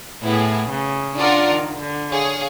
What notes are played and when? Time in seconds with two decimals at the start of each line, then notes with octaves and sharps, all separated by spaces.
0.23 A2 B3 E4 G#4
0.69 C#3
1.16 D4 F4 A#4 D5 F#5
1.48 D#3
1.79 D3
2.10 G#4 C#5 F5